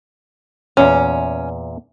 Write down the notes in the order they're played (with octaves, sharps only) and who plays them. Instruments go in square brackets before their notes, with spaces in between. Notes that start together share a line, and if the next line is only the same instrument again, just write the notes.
[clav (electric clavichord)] E2 A#2 [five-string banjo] C#4